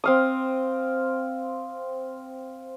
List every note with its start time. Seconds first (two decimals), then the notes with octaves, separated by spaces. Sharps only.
0.04 C4 F5 D#6